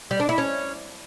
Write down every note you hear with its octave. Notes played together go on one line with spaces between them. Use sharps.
G3
D4
E4
C#4